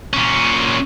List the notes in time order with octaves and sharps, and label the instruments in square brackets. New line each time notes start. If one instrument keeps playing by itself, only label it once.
[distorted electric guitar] A#2 C#4